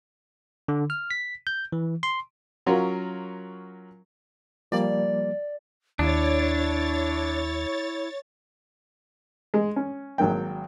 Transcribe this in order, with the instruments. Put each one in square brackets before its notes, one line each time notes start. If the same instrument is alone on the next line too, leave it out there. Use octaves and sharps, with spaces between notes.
[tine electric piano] D3
F6
B6
G6
E3
C6
[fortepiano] F#3 C#4 F4 F#4 A#4
[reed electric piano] F3 G3 A#3 [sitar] D5
[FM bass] D#2 [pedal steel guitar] D4 [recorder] E4 [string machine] C#5 A6
[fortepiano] G#3
C#4
G#1 F#3 A#3 G5